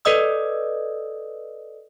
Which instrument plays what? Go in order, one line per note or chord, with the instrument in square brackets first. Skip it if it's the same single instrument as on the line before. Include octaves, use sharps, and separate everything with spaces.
[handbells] A4 B4 D5 D#5 D#6 E6